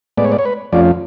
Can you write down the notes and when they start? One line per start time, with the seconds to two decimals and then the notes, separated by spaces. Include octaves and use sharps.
0.17 A2 G#3 B3 D5
0.24 C#5
0.32 D5
0.38 C#5
0.45 B4
0.73 F2 F3 A3 C#4 F4 D5